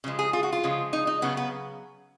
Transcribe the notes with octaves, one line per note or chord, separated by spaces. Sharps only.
C#3 F3 G#3
G#4
F4
F#4
F4
C#3 F3 G#3
D#4
D#4
C#3 F#3 B3
B3